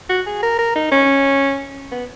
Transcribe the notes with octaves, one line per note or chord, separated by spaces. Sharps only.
F#4
G#4
A#4
A#4
D#4
C#4
B3